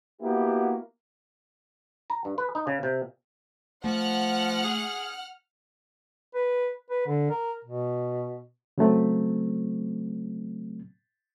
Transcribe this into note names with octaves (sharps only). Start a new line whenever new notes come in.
A#3 B3 E4 F#4 G4 A#4
A#5
G2
B4
D#4
C#3
C3
F3 A3 F#5 F6
G#4
B4
B4
D3
A#4
B2
C#3 F#3 A3 C4